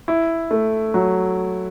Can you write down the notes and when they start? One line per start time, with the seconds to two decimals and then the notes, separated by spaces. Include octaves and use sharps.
0.08 E4
0.51 A3
0.94 F#3